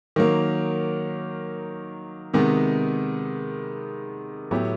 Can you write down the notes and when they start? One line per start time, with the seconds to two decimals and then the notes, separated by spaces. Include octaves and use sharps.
0.16 D#3 F#3 A#3
2.33 C3 D#3 G#3 B3
4.51 A2 F#3 B3 E4 G4